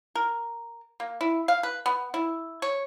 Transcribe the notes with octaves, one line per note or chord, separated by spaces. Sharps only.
A#4
A#3
E4
F5
B4
B3
E4
C#5